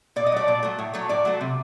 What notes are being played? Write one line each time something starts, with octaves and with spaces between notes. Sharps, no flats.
A#2 D5
D#5
F#3 A3 D5
A#2
F#3 A3
A2
F#3 A3
A2 D5
F#3 A3
C3